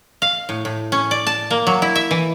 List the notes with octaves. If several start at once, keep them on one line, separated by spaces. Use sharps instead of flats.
F5
A2
A2
C#4
D5
A5
A#3
F#3
E4
E5
E3